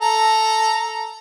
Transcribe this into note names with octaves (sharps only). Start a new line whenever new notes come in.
A4 A#5